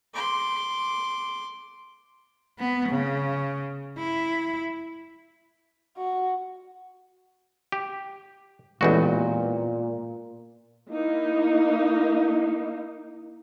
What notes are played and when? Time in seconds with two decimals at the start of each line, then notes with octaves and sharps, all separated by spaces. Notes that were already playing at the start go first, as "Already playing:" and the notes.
0.14 C6 D6
2.59 B3
2.89 C#3
3.98 E4
5.98 F#4
7.72 G4
8.81 A1 E2 A#2 G#3 B3 F#4 B4
10.90 A#3 D#4 E4